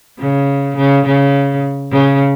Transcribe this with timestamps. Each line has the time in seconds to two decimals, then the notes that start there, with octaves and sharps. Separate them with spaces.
0.19 C#3
0.76 C#3
1.06 C#3
1.92 C#3